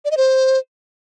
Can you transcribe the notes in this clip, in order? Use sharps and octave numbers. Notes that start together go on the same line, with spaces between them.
D5
D#5
C5